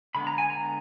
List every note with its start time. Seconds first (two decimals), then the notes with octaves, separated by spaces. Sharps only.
0.15 D3 G#3 B3 B5
0.27 A#5
0.38 G#5
0.50 A#5